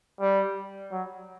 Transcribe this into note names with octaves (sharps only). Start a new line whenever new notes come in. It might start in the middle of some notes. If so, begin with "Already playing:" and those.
G3
F#3